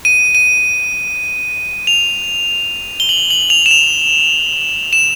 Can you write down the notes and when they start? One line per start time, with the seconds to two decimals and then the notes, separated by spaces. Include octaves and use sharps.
0.05 D#7
0.35 D#7
1.87 F7
3.00 G7
3.09 F#7
3.30 F#7
3.50 F7
3.66 E7
3.71 F7
4.93 E7